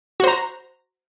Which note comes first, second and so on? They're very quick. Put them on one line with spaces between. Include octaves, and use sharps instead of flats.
F#4 C5 A#5